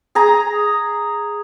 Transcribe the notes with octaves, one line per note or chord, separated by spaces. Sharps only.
G#4 G#5 A#5